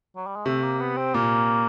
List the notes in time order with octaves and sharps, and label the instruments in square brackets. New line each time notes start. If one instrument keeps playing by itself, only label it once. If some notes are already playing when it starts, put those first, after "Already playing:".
[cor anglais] F#3
G3
G#3
[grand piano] C3 [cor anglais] A3
[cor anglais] A#3
B3
C4
[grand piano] A#2 [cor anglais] A#3